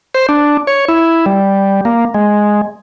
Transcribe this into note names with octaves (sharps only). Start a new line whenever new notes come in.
C5
D4
C#5
E4
G3
A#3
G#3